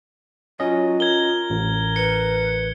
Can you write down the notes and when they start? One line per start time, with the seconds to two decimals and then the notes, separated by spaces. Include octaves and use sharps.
0.60 F#3 C#4 F4 D#5
1.00 A#4 G#6 G7
1.50 A1
1.96 B4 C#7